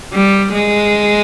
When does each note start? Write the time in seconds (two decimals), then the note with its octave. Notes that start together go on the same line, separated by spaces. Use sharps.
0.13 G3
0.54 G#3